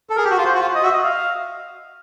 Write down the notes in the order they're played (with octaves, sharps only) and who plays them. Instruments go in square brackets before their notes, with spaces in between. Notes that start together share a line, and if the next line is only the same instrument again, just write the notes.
[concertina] A4
[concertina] G#4 [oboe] A#4
[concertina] G4
F#4
F4
[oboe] C5
[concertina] F#4
F4
[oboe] D#5
[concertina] F#4 [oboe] E5
[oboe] D#5
F5